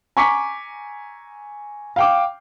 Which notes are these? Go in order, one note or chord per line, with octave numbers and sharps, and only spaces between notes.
G#5 A#5 C#6 D6 B6 C#7
F5 G5 D6